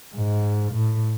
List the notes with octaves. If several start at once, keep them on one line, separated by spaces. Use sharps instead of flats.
G#2
A2